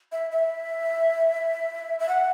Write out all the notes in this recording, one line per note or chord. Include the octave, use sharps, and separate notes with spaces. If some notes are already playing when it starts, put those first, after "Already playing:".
E5
E5
E5
F#5